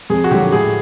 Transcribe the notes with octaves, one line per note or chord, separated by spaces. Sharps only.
F2 G#4
F#4
D3 F#3 G4
A2 G#4